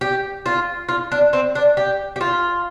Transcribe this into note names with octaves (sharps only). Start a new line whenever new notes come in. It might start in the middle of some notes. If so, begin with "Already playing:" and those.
G4
F4
F4
D4
C4
D4
G4
G4
F4